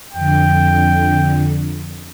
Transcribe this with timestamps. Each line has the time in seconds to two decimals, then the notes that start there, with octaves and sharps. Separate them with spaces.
0.13 F2 D3 G5